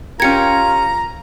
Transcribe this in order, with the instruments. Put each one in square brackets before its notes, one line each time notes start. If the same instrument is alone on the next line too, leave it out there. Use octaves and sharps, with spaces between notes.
[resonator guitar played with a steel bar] C#4 G4 A#4 [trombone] F4 [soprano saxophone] A#5 [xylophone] G#6 C#7